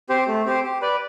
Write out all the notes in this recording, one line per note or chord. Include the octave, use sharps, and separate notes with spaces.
C4 G4 C5
A3
C4 G4 C5
G4
B4 D5